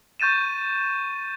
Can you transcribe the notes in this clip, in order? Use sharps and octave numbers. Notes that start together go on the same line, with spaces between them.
C#6 G6 A6 D#7 E7